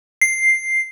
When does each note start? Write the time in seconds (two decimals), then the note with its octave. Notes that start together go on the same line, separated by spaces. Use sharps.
0.21 C7